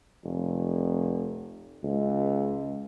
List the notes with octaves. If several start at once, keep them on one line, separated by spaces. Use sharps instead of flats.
F1
C#2